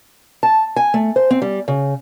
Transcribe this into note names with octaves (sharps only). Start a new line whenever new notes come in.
A5
G#5
A3
C5
C4
G3
C#3